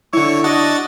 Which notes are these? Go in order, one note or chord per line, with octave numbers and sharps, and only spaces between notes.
D3 E4 C#5 C#6
D4 F#4 D#5 A6